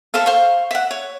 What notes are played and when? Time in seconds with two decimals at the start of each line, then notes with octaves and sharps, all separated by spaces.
0.14 A4 C5 E5 F5
0.26 C5 F5 C#6
0.71 E5 F#5
0.91 C#5